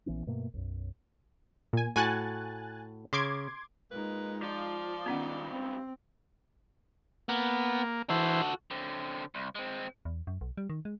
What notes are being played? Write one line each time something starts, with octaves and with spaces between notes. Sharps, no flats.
A#1 E3 B3 C#4
G2 B2 A3 A#3
B1 F#2
A#2 G#5
A2 F#4 G#5 F#6 A6
C#3 C6 D6 G#6
A#2 G#3 A#3 D#4 B4
F3 F4 D5
G#2 D#3 G3 B3 C#4 F#5
C4
A#3 B3
E3 F#4 A4 C5
D3 C4
C2
G#3 C4
E2
F#2
B1
G3
D#3
G#3